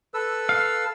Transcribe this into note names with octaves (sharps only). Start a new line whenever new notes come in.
A4 B4 E6
F5